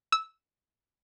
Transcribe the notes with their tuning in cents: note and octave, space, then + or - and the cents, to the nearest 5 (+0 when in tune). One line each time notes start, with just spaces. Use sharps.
E6 -15